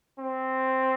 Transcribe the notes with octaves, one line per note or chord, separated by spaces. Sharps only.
C4